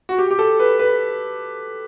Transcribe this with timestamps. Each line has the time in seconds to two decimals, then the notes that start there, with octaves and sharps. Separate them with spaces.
0.09 F#4
0.19 G4
0.31 G4
0.39 A4
0.60 B4
0.79 B4